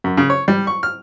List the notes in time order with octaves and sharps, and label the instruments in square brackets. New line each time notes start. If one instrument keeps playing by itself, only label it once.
[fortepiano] F#2
C#3
C#5
G3
C#6
F6